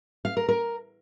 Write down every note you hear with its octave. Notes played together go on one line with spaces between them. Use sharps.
F5
A#4
A#4